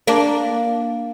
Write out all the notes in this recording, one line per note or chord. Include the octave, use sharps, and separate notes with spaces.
A#3 D4